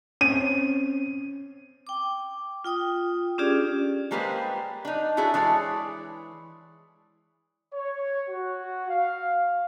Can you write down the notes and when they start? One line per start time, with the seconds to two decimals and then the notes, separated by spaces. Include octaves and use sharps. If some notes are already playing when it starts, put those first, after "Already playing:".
0.21 C4 C#4 D#7
1.87 G5 D6
2.64 F4 G5 D#6
3.38 C#4 D4 F4 G4 G#4 D5
4.11 G3 G#3 A#3 G4 B4 C5
4.85 D4 D#4
5.17 E4 F#4 G#4 A4 D5
5.34 E3 G#3 C#5 D5
7.74 C#5
8.30 F#4
8.89 F5